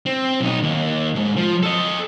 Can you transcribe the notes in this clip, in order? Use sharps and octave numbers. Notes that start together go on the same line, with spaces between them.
C4
B1 D#4
D#2
D#2 G#2
F3
A4 D#5